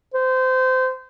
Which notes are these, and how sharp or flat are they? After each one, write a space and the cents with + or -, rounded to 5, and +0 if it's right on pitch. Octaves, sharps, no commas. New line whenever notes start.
C5 -25